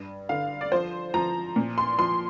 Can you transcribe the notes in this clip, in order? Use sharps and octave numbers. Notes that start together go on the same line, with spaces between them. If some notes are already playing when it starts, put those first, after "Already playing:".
Already playing: G2
D3 F5
D5
F3 C5
F3 A#5
A#2
C6
F3 C6